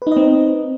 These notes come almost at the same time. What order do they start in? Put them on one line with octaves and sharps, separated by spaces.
B4 D#4 D#5 C4